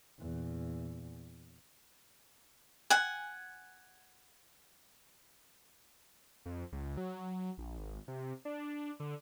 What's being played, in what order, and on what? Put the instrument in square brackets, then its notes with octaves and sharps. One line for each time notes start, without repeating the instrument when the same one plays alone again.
[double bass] E2 A#2
[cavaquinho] F#5 G#5
[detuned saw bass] F2
C#2
F#3
A#1
G#1
C3
D4
D3